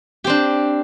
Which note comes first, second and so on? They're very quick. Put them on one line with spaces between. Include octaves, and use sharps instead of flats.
G4 C4 D4